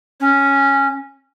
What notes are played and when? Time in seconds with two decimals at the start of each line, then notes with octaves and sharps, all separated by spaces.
0.20 C#4